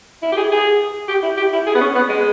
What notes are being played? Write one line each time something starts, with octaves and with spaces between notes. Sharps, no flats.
E4
G4
G#4
G#4
G4
E4
G4
E4
G#4
B3
C#4
B3
G#3